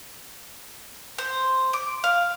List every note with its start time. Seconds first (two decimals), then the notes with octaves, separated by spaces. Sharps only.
1.18 C5
1.73 D6
2.04 F5